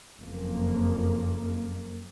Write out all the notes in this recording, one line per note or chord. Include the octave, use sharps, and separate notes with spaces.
F#1 F2 A#3